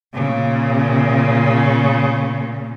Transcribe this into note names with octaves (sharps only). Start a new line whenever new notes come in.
A#2 C#3